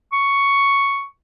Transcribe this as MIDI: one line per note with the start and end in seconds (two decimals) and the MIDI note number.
0.12 1.06 85